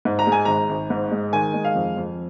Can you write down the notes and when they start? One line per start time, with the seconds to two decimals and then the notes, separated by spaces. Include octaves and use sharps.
0.05 G#2
0.19 A#5
0.27 G#3
0.32 G#5
0.45 G#1 A#5
0.69 G#1
0.90 G#2
1.12 G#3
1.33 D#3 G#5
1.54 G#3
1.65 F5
1.75 F2
1.97 F2